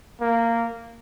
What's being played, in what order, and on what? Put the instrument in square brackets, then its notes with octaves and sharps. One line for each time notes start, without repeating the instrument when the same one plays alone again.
[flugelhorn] A#3